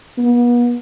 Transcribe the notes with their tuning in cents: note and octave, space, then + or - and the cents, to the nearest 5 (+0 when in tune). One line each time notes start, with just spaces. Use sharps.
B3 -40